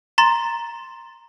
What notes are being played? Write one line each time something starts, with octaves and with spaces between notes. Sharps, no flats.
A#5 C6 A6